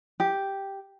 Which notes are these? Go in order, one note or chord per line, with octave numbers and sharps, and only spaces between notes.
G4